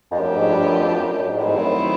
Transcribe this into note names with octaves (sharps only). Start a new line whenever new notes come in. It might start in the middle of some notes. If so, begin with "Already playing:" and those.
F2
F#2 F3 A3 D4 G4
G#2
G2
F#2
F2
F#2
F#2
G#2
A2
G#2 D#3 F#3 A3 C4 E4
G2
F#2